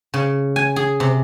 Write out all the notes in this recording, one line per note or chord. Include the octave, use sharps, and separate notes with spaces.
C#3
G#5
G#4
C3